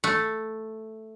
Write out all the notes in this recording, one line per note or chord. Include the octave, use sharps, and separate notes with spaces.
A3